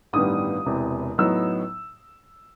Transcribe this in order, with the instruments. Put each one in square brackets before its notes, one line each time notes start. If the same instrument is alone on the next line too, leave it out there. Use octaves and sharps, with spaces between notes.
[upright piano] A1 G2 D#3 G3 B3 D#6
E1 E2 C3
A2 F#3 B3 D#4 E6